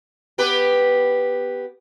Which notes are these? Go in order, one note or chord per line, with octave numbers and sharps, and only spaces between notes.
B3 G4 B4